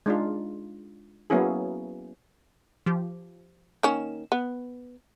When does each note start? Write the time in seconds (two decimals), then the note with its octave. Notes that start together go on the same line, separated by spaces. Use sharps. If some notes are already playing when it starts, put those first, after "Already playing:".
0.06 G#3 D4 D#4 F4
1.30 F#3 A#3 B3 C#4 E4 G#4
2.86 F3 G4
3.83 D#3 A#3 C#4 E7
4.32 B3